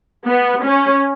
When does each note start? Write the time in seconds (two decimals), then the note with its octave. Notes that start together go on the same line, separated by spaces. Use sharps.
0.27 B3
0.64 C#4